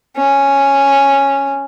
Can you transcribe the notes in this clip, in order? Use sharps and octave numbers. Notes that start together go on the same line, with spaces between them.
C#4